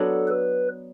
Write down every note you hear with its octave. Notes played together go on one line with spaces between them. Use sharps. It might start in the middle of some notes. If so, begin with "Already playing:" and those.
Already playing: F#3 B3 D4 A4
B4